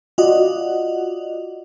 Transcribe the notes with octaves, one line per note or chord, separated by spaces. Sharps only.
F4 F#4 D5 D#5 F#5